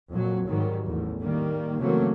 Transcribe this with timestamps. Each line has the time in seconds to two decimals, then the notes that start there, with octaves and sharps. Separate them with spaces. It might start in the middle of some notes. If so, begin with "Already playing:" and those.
0.10 F2 A#2 F#3
0.46 G#2 D#3 F#3 G3
0.84 A1 E2
1.22 D#3 G3 A#3
1.79 C#3 E3 F#3 A3 A#3 C4